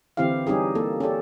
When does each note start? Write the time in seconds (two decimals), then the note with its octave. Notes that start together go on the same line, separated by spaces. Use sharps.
0.17 D3 E3 C4 E4 G4 F5
0.47 G3 C#4 D#4 G4 G#4
0.75 A#3 A4
1.00 C#4 G4 A4 D5